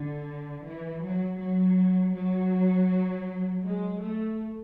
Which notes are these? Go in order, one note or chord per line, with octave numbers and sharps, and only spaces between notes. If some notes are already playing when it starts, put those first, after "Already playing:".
Already playing: D3
E3
F#3
F#3
F#3
G#3
A3